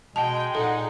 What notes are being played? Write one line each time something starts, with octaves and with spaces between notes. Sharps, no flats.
B2 G#3 G5 A5
A#2 D#4 G#4 A4 F#5